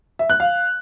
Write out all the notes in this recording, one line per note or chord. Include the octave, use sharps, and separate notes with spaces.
E5
F#6
F5